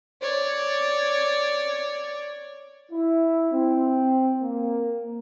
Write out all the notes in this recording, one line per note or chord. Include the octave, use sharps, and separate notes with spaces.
C#5 D5
E4
C4
A#3